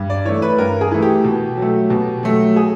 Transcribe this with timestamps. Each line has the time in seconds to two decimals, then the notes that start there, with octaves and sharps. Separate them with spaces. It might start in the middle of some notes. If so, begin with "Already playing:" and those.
Already playing: G2
0.10 D5
0.25 E3 A3 C#5
0.42 B4
0.58 G2 A#4
0.81 G#4
0.91 E3 A3
1.02 G4
1.24 B2
1.57 F#3 A3
1.90 B2
2.23 F#3 A3
2.56 G#4